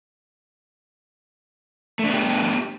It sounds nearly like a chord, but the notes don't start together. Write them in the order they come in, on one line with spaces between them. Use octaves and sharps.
A3 D4 B3 G4